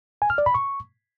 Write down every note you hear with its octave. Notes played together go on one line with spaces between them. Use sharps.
G#5
F6
D5
B5
C#6